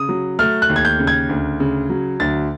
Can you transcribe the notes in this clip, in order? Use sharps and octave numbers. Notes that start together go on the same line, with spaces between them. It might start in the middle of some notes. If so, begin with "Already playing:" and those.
Already playing: C#3 D#6
F#3
A3 F6
F#6
D#2
G#6
G6
C#3
G#6
D2
C#3
F#3
D2 A6